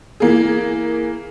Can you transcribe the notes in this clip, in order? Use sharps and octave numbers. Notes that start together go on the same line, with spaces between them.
E3 A#3 G#4